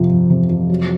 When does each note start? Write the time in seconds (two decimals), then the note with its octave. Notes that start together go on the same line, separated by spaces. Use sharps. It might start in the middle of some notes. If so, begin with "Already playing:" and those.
Already playing: F2 C3 F3
0.10 F2
0.30 C3
0.50 F2
0.70 F#3